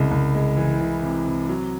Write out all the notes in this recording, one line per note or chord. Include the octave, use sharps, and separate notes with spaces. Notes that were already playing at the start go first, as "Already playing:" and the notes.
Already playing: C2 C#3 G#3
C2
G#3
E3
E3
C3
C3
F#3